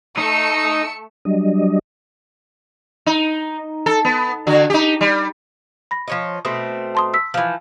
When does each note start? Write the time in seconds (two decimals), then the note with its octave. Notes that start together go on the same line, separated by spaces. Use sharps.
0.17 A3 D#4 E6 C#7
1.25 F#3 G3 D4 D#5
3.06 D#4
3.86 A4
4.05 B3
4.47 D3 F#4
4.70 D#4 G4
5.01 G3
5.91 B5 A#6
6.08 F3 C#5 D#5
6.45 B2 A3 C4 D#6
6.95 A5 C6 D#6
7.14 E6 B6
7.34 E3 F3